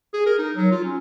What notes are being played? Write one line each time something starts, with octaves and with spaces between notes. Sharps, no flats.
G#4
A#4
D#4
F#3
F4
C#4